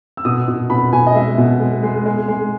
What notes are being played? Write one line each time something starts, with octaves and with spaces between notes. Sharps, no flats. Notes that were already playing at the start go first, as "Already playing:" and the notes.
E6
B2 D#6
B2
B2 B5
B2 G#5
D#5
G#3 E5
B2
G#3
G#3
G#3
G#3